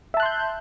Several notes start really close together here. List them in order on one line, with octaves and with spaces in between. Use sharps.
E5 A5 F#6 C6 G6